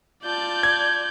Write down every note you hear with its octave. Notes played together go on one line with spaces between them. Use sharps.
F4 D5 A5 G6
G#6